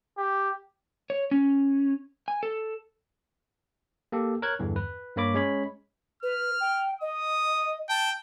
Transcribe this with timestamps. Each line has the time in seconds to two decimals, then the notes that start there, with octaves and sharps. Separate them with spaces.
0.17 G4
1.10 C#5
1.31 C#4
2.28 G#5
2.43 A4
4.12 A#3 G4 A4
4.42 A#4 C#5 F#6 G#6
4.59 E2 G2 D3 E3
4.76 B4
5.16 G2 A#3 C#5 B5 D6
5.34 G#3 C#4 C#5 B5
6.23 B4 F6
6.60 G5
7.01 D#5 D#6
7.89 G5 A5